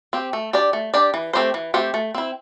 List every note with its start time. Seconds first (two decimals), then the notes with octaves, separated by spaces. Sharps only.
0.13 C4 G4
0.33 A3
0.53 D4 G4 D5
0.73 A3
0.94 D4 G4 D5
1.14 E3
1.33 A3 C4 G4 C5
1.54 E3
1.74 A3 C4 G4 C5
1.94 A3
2.14 C4 E4